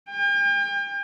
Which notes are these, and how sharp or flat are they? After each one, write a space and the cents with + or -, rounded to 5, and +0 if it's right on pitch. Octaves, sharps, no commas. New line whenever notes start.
G5 +40